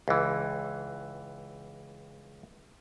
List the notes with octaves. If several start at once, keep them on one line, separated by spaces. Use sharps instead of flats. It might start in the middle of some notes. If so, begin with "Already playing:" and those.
C#2 E3